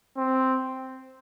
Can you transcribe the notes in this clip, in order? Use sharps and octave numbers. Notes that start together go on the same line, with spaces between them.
C4